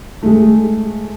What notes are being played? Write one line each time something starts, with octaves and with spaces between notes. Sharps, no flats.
G#3 A3